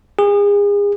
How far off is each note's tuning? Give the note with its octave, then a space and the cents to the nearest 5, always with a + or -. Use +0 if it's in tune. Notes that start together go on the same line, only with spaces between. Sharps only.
G#4 -35